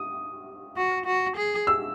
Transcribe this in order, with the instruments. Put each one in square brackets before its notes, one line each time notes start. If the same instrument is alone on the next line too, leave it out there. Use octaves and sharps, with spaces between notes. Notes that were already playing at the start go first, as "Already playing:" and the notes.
Already playing: [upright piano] D#6
[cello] F#4
F#4
G#4
[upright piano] E6